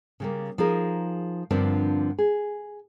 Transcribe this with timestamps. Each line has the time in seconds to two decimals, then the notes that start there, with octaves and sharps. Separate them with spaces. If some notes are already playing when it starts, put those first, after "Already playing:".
0.20 C#3 G3 A#3
0.58 F3 D#4 G#4 A#4
1.51 G2 D3 F3 A#3 C4 D4
2.19 G#4